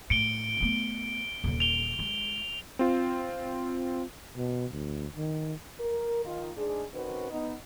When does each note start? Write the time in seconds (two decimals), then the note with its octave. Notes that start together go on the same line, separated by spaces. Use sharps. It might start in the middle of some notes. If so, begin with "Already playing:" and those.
0.10 A2 C#7 D7 G7
0.60 A3 B3
1.44 D#1 D3
1.60 F7 G7
1.99 G#3
2.79 C4 F4
4.36 B2
4.71 D2
5.16 D#3
5.80 A#4
6.24 D#3 F4
6.56 G#2 G#3 D4 G#4
6.93 D#3 C4 C#4 F#4 B4 C5
7.30 B3 D#4